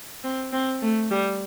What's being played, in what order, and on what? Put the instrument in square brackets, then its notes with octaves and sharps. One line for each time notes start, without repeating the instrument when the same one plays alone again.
[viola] C4
C4
A3
G3